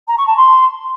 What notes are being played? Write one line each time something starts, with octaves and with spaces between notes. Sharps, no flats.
A#5
C#6
A5
C6